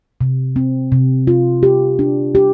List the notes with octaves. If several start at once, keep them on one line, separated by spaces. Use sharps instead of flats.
C3
C4
C3
F4
G4
D4
G4